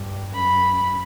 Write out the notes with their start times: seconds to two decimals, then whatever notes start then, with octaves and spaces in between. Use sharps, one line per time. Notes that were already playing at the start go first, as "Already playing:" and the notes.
Already playing: G2
0.34 F#2 B5